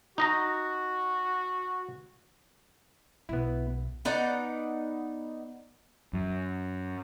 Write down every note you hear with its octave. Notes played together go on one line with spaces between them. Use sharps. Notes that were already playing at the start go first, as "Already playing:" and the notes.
D#4 F#4 D#5 A#5
B1 B3 E4
B3 D#4 D5 F#5
F#2